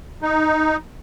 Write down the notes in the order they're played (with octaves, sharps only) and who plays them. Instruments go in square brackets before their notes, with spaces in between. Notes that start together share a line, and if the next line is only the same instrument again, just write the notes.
[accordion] D#4